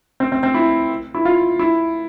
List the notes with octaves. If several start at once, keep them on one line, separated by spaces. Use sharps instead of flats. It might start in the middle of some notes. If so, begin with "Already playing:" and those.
C4
C4
C4
E4
E4
F4
E4